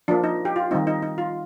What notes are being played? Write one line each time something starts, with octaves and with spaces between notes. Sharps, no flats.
F3 A#3 D4
D#4
G4
F4
D#3 G3 C4 D#4
D#4
D#4
F4